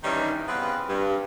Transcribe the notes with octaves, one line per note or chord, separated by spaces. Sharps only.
G2 D#3 E3 G3 C#4 D#4
C#3 B3 C4 B4
G2